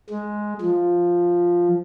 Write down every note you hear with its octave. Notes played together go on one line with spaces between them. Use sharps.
G#3
F3